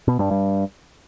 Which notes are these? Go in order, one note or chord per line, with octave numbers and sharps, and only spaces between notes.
B2
G2
G2